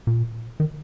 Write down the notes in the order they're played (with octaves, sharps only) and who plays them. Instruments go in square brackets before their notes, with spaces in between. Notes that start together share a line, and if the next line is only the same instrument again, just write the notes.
[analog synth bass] A#2
D#3